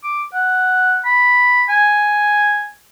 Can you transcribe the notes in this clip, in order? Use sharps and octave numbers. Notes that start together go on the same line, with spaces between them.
D6
F#5
B5
G#5